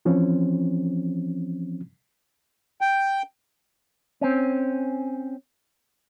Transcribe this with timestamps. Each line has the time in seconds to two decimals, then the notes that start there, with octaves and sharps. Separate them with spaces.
0.05 E3 F3 C4 C#4
2.81 G5
4.21 C4 C#4